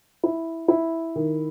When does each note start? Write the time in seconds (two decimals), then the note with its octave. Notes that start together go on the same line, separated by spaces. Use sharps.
0.23 E4
0.68 E4
1.16 D#3